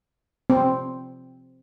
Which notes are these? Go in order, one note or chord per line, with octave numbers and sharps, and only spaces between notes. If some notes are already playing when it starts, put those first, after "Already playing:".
C4